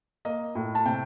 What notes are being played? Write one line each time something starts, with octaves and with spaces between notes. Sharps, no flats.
A#3 D#5
A2
A5
C3 G5